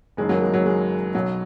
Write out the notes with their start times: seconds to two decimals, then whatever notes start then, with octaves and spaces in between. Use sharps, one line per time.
0.17 F#1 F#2 D#3 G#3
0.29 F#3 A#3
0.41 G#3
0.54 F#3
0.66 G#3
1.14 B1 B2 F#3